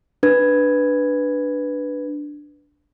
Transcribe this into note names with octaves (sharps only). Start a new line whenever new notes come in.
D4 B4 G#6